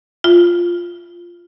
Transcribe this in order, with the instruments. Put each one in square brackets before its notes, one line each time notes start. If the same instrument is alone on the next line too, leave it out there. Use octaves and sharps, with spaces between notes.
[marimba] F4